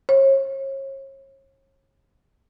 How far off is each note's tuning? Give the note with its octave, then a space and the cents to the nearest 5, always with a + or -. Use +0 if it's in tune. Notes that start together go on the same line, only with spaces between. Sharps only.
C#5 -40